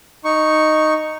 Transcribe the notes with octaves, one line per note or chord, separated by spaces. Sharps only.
D#4 C#6